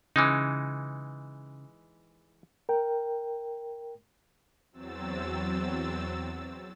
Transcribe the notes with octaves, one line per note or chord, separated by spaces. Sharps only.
C#3 E3 G#3 D#4
A#4 G5
E2 F#3 C4 E6 A6